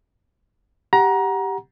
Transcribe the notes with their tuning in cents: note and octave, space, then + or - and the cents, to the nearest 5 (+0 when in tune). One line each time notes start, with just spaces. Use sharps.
G4 +0 F#5 +0 A#5 +25